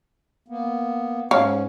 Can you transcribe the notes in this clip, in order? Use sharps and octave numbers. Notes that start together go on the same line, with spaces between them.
A#3 B3
G#2 C#4 C#5 F5